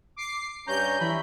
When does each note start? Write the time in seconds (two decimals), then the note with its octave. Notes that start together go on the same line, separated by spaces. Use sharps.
0.16 D6 C7
0.67 G2 C#4 A#5 G6
1.01 E3 B5